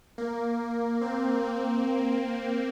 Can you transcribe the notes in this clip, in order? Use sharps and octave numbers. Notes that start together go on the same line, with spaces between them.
A#3
C4
A#3